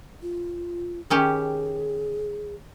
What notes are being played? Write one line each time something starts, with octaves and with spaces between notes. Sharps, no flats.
F4
D#3 C#4 G4 G#4